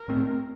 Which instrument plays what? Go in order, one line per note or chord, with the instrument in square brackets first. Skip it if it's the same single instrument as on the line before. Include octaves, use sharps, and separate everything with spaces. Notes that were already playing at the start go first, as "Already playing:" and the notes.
Already playing: [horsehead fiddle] A#4
[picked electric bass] A2 A3 C4